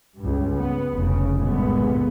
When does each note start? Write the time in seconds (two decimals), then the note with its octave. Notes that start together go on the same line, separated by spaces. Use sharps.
0.17 C#2 G2
0.57 B3
0.96 F1 C#3
1.36 C#2 G2 A#2 D3 G#3 B3